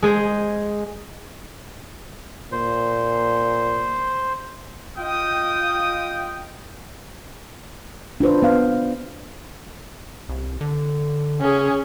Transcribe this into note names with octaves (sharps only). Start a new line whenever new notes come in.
G#3 G#4 C5
A#2 C5
F4 D#5 G5 D#6
D4 F4 B4 C5
B3 F5
C2
D3
C#3 C#4 G#4